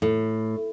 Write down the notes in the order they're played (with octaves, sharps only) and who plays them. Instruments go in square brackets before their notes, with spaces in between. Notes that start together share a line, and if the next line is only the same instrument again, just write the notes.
[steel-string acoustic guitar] A2